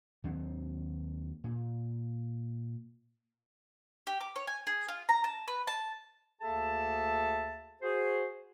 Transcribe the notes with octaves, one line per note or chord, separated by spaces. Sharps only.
D#2 F#3 C4
A#2
G4
D6
C#5
G#5
G#4
F4
A#5
A5
B4
A5
D2 A#3 G#4 A4 E5 A5
F#4 G#4 C5